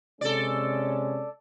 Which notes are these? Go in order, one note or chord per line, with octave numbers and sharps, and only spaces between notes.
C3 G#3 C#4 A4 D5